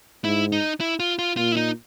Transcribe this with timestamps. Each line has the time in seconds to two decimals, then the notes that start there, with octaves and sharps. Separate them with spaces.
0.24 G#2 E4
0.52 D#4
0.80 E4
1.00 F4
1.19 F4
1.37 A#2 F4
1.52 E4
1.57 D#4